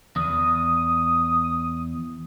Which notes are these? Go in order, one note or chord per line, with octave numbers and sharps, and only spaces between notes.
E2 D#6